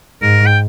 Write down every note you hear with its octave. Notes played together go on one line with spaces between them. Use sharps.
G#2 A#4
G5